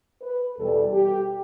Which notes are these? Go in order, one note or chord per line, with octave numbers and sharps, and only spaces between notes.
B4
E2 B2 G3 A4
G4